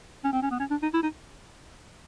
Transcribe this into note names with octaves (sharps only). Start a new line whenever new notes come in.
C#4
C4
C#4
B3
C#4
D4
D#4
E4
D#4